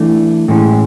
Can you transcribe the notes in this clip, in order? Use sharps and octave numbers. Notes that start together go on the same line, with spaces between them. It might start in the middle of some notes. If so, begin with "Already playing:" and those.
Already playing: E3 A3 D4
A2 E3 G#3 C#4